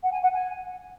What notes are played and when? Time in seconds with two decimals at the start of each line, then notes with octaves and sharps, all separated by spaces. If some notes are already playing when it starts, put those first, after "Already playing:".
0.03 F#5
0.12 G#5
0.23 F#5
0.34 G#5